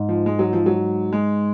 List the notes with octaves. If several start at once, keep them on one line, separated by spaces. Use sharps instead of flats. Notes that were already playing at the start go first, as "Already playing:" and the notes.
Already playing: G#2
F3
G#3
F#3
F3
F#3
G#3